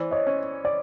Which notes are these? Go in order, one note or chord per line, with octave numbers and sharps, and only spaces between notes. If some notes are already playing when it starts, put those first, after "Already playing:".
Already playing: E3 C5 D5
C#5 D#5
C#4
D5